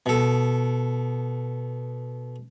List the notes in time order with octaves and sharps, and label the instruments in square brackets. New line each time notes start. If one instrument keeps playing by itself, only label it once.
[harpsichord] B2 A4